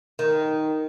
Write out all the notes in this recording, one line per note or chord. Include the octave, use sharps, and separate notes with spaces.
D#3